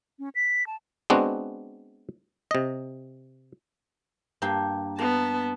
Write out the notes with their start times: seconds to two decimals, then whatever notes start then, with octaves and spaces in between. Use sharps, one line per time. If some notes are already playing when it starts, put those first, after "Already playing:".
0.19 C#4
0.35 B6
0.67 A5
1.10 G#3 B3 C4 D4 F#4
2.51 C3 D#5
4.42 G2 A#3 G4
4.99 B3 A5 A#5